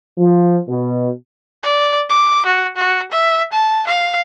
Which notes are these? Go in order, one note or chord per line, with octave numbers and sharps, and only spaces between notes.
F3
B2
D5
D6
F#4
F#4
E5
A5
F5